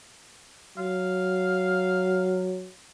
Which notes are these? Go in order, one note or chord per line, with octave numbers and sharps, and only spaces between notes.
F#3 F5